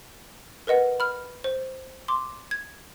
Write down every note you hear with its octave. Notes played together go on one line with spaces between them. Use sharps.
A#4 B4 D#5 F#5
B5 F6
C5
C6 D6
G#6